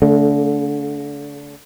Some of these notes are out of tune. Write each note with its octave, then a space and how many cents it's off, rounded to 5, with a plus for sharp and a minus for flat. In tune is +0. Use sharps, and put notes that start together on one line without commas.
D3 -35 A3 +0